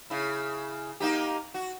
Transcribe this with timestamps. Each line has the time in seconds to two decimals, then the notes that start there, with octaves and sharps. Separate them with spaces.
0.10 C#3 E4
1.00 A#3 D#4 G4
1.54 F#4